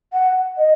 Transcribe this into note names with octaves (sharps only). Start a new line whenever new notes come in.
F#5
D#5